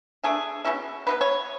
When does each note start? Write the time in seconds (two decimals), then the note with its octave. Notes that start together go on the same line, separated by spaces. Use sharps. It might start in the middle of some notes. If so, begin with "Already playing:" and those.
0.24 E3 A3 D4 G#4
0.65 B2 A3 C#4 E4
1.07 B2 F#3 B3 B4
1.21 C#5